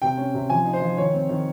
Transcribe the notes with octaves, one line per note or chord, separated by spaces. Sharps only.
C3 G5
C#4
C3
F3 G#5
D#4
C5
F3
D#3 C#5
C4
D#3